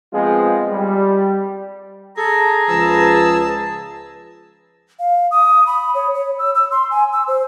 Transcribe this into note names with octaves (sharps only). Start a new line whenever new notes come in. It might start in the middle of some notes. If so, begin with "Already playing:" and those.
F3 G#3 B3 C4 F4 G#4
G3
G#4 A4 A#5
C#2 F3 B4 A5 E6
F5
D#6
B5
C#5
C#5
E6
E6
C6
G#5
E6
C5